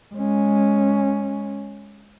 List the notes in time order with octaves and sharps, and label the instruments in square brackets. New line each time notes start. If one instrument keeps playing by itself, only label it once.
[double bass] G#3 C#4